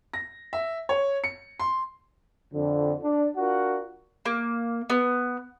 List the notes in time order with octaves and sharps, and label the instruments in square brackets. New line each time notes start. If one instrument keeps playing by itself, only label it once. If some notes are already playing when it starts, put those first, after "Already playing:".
[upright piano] A#6
E5
C#5
C#7
C6
[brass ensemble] F2 D3
D4
D4 F4 F#4 A#4 F#5
[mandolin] A#3
B3